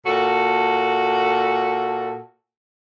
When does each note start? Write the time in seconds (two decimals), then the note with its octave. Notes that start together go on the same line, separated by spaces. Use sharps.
0.06 A#2 F#4 A4